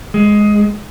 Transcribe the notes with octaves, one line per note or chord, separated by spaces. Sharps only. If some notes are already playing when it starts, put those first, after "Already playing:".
G#3